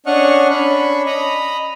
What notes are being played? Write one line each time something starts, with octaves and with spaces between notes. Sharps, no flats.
C#4 D4 D#5 F#5 C#6 F6
C#4 D4 B5 C#6
D#5 A#5 B5